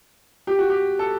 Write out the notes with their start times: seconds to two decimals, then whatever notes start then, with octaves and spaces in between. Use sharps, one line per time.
0.47 G4
0.59 F#4
0.70 G4
0.99 A4